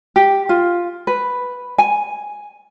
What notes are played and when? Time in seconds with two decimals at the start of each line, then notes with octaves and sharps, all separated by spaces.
0.16 G4
0.49 F4
1.07 B4
1.78 G#5